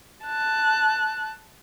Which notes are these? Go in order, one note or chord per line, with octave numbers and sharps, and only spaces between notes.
A5 F#6